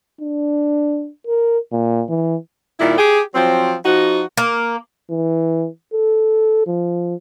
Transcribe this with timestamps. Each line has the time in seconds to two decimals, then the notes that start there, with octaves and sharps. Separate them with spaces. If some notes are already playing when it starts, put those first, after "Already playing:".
0.21 D4
1.27 A#4
1.72 A#2
2.09 E3
2.79 A#2 D#3 G3 E4
2.98 G4 G#4
3.34 F3 F#3 C4
3.85 F3 D#4 F#4
4.37 A#3
5.10 E3
5.93 A4
6.67 F3